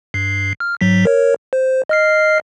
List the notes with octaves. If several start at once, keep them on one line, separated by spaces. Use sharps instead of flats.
G2 C7
F6
G#2 F#3 B6
A#4 C#5
C5
D#5 F6 C7